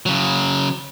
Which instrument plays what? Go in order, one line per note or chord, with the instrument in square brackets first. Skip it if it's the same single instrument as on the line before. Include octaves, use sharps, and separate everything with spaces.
[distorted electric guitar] C#3 F#3